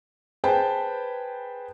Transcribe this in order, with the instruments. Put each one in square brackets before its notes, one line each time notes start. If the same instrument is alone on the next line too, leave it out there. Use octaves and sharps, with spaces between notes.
[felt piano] G#4 B4 C5 G5 A5